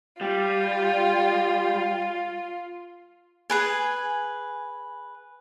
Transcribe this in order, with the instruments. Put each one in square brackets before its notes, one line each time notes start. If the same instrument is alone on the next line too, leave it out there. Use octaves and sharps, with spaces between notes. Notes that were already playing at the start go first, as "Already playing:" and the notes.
[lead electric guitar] G3 [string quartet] F4
[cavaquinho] G#4 B4 G#5